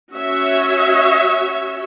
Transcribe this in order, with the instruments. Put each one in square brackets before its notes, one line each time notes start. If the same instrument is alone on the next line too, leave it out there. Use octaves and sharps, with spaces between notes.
[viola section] C#4 F#4 C#5 E5